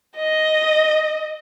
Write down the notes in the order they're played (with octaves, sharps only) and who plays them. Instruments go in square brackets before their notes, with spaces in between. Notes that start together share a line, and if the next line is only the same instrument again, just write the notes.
[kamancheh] D#5